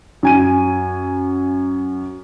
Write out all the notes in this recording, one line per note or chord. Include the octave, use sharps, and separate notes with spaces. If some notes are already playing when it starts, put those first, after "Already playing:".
F#2 G#5 D#7